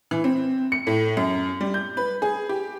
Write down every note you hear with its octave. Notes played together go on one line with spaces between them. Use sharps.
E3
C4
C#7
A2
F#2
G3
G6
B4
G#4
G4